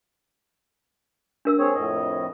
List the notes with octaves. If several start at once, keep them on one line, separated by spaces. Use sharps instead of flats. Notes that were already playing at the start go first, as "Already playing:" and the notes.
D4 A#4 E6
C4 G#4 C#5
F2 A2 D#5